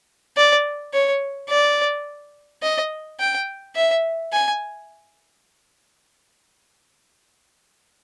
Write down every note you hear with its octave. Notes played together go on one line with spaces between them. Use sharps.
D5
C#5
D5
D#5
G5
E5
G#5